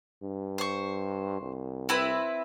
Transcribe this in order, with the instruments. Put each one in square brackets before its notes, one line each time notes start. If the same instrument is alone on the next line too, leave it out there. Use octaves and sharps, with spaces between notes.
[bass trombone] G2
[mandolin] C5 C#6
[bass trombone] C2
[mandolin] C4 E4 B4